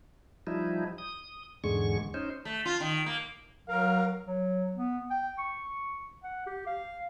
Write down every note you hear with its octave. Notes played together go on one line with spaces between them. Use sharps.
F3 G3 D#4 E4
D#6
E2 G#2 D3 G#3 C#6
C#4 D#4 C5
A3
F4
D#3
A#3
F#3 A#4 F5
F#3
B3
G5
C#6
F#5
G4
F5